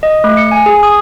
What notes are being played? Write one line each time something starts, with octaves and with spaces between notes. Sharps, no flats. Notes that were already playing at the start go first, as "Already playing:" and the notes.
D#5
A3
C#7
G#5
G#4
D#6